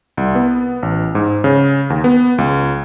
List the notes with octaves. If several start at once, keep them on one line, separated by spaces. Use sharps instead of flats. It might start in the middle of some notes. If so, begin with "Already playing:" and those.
C2
B3
A1
G#2
C#3
D#2
B3
C#2